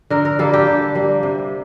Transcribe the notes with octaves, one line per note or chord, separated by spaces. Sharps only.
D3 A#4
A#4
G3 A#3 A4
G4
D3
G3 A#3
C3